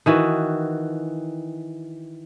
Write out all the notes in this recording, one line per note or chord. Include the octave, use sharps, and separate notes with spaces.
D#3 E3 F#4